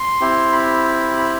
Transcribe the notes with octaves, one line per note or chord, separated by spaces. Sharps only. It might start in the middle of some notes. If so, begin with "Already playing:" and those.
Already playing: C6
C4 E4 G4
B5
B5